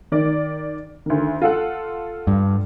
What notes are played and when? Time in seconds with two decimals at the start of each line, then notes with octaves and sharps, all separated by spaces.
0.12 D#3 D5
1.06 D2 D#3
1.42 F4 A4 F#5
2.27 G2